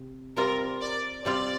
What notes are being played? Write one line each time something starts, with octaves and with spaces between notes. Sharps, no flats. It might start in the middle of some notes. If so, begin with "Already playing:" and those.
Already playing: C3
C3 G3 C4 F4 A#4
D5
C3 G3 C4 F4 D5